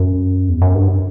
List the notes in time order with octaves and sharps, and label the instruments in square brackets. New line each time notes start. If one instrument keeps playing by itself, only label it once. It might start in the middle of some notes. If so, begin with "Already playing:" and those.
Already playing: [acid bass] F#2
E2
F#2
G2